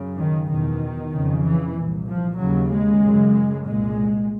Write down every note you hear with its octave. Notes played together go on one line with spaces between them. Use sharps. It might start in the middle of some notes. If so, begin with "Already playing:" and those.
Already playing: F#2 C#3
D#3
E2 B2 D#3
F2 C#3
E3
C2 A#2
F3
D#2 C#3 F#3
G#3
F#2 C#3
C2 A#2 G#3